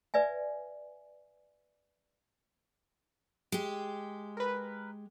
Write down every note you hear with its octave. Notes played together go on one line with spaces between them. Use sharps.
B4 D5 E5 G#5
G#3 G4
A#4 B4